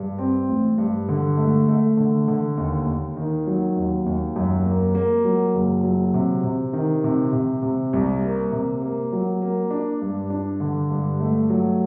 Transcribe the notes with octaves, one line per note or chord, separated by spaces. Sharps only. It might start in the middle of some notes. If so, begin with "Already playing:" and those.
Already playing: G2
C4
A1
G2
D3
A3
A3
D3
D3
D#2
D#2
D#3
F#3
D#2
D#2
F#2
A#3
A#3
F#3
F#1
F#3
C3
C3
D#3
C3
C3
C3
C2
A#3
C3
A#3
F#3
A#3
D4
G2
D4
D3
G2
A3
F#3